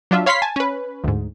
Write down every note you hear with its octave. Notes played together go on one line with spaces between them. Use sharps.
F#3 D4 F4 E5
C#5 F5 B5 C6 B6 C7
G#5 A5
C#4 B4
D2 G#2